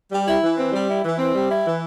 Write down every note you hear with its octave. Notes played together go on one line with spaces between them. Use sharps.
G3
E4
E3
C4
G3
E4
E3
C4
G3
E4
E3